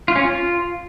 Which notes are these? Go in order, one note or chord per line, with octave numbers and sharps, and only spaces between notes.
F4
C#4
F4